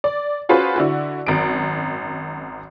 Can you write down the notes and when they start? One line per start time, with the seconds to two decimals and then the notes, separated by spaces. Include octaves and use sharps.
0.04 D5
0.49 C#4 F4 F#4 G#4 B4 C5
0.76 D3 E4 F#4
1.27 G#1 F#2 D7